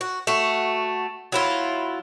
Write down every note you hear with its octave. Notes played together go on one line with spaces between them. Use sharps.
F#4
A3 F#4
F#3 E4 F4